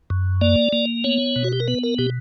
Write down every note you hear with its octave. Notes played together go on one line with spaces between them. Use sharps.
F#2
A#3 D5
A#3
B3 C#5
B2
F#4
G4
A#4
B3 B4
A#4
B2 G4